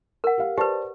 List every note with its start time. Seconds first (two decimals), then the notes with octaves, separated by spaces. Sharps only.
0.24 A#4 F#5
0.38 G4 F5
0.58 G4 B4 C5 D5 A5